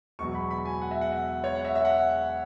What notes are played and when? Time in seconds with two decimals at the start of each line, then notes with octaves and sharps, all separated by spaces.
0.19 E1 E2 B2 F#3 C#6
0.35 B5
0.51 B5
0.65 G#5
0.81 F#5
0.91 E5
1.01 F#5
1.12 E5
1.44 C#5
1.55 F#5
1.65 E5
1.75 E5
1.85 F#5